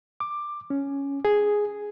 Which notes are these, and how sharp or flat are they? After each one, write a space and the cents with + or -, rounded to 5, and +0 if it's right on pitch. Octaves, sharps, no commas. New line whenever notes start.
D6 +10
C#4 +5
G#4 +0